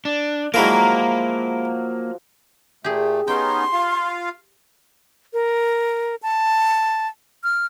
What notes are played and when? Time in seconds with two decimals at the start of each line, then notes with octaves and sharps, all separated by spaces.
0.05 D4
0.54 F3 F#3 G#3 A#3 E4 A#4
2.84 A#2 A3 G4 G#4
3.28 B3 C#4 D#4 G5 C6
3.73 F4 F5
5.33 A#4
6.23 A5
7.44 F6